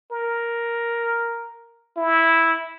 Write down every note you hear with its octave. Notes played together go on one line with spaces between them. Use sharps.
A#4
E4